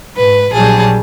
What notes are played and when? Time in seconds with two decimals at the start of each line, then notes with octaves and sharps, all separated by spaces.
0.17 G#2 B4
0.54 A#1 F#3 G3 G#4 A5